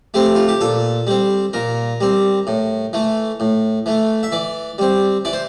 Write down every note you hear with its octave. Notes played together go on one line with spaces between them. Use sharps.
A3 C4 G4
F4
G4
A#2 A4
G3 C4
A#2 A#4
G3 C4
A2
E3 A3
A2
E3 A3
E5
E3 D5
G3 C4
E3 D5
C5